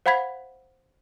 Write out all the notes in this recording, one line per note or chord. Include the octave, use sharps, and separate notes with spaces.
C5 F5 F#5 B5 G#6 B6